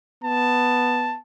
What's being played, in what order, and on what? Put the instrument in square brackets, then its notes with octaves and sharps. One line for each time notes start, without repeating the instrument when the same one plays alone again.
[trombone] B3 [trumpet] A5